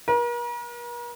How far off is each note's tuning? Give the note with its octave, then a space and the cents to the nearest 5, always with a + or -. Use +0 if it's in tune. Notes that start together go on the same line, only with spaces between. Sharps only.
A#4 +45